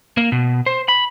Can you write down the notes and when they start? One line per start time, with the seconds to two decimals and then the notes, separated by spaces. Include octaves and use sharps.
0.17 A#3
0.32 B2
0.66 C5
0.88 B5